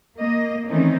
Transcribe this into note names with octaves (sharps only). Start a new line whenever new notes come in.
A#3 D#5
D#3 E3 A3 C4 C#4 D#4